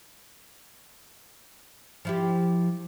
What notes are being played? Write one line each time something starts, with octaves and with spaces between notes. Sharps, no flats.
F3 E4 G4